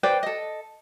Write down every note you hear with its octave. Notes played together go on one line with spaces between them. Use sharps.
B4 C5 D5 G5
A4 D#5